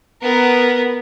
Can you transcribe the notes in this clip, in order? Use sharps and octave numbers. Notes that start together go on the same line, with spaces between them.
B3 A#4